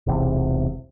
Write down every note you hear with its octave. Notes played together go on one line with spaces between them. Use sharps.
E1 B1 E2 C3